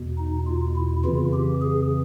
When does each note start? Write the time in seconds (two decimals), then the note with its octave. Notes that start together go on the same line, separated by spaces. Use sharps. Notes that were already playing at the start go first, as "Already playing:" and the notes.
Already playing: E2 B2
0.18 D#4
0.47 F4
0.75 E4
1.05 F2 C#3 E3 F4
1.33 G4
1.62 G#4